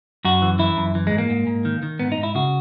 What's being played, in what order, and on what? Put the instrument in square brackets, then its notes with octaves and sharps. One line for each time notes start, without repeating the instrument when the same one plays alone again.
[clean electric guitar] F#2 F#4
E3
E3 E4
F#2
E3
G#3
G#2
A#3
G#2
G#2
D#3
D#3
G#2 B3
D#4
G#2
E4
C#3 F#4